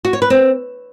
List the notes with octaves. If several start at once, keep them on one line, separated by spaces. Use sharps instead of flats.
F#4
C#5
B4
C4